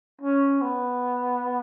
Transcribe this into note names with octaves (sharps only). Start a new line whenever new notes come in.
C#4
B3